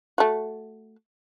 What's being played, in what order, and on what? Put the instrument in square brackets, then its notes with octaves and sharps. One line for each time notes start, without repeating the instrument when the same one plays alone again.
[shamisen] A3 F#4